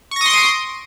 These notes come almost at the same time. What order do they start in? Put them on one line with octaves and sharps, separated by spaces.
C#6 A#6 D#6 C6 D7